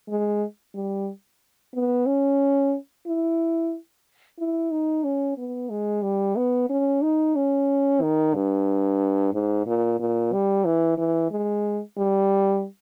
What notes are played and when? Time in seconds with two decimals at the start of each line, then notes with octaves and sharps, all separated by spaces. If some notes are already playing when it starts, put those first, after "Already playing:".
0.09 G#3
0.75 G3
1.74 B3
2.06 C#4
3.06 E4
4.38 E4
4.71 D#4
5.04 C#4
5.38 B3
5.70 G#3
6.03 G3
6.36 B3
6.70 C#4
7.02 D#4
7.36 C#4
8.02 D#3
8.34 G2
9.33 G#2
9.67 A#2
10.00 A#2
10.33 G3
10.65 E3
10.98 E3
11.31 G#3
11.98 G3